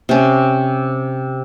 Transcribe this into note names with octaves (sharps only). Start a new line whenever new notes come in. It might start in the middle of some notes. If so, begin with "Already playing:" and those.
C3 C#4